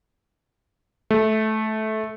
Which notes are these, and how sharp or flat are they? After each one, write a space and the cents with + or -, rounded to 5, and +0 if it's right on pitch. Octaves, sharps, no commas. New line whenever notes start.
A3 -15